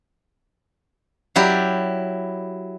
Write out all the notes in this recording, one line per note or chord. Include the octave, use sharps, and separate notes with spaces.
F#3 E4 G4 D5